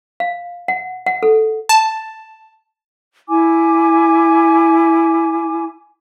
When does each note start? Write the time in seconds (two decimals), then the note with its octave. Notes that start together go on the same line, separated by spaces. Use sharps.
0.20 F5
0.68 F#5
1.06 F#5
1.23 A4
1.69 A5
3.28 E4 G#5 D6